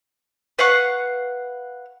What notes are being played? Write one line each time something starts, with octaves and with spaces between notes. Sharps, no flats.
B4 F5 F#5 C#6